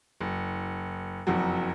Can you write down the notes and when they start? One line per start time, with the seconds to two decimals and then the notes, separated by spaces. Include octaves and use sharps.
0.21 F#1
1.27 F#1 F2 F#3